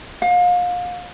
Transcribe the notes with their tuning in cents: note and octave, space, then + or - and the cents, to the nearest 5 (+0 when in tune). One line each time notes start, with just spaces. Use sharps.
F5 +35